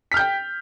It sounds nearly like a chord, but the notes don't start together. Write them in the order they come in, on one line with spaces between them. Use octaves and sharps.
B6 F6 G6 G5